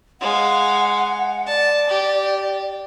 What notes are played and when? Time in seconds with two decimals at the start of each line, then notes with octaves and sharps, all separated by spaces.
0.21 G#3 F5 F#5
1.47 D5 A5
1.89 G4